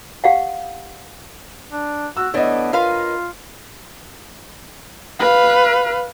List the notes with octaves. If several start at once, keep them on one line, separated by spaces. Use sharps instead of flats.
G4 F5 F#5
D4
F#4 E6
E3 A3 B3 D4 C#5 D#5
F4 A#4 B4 F5
B4 F5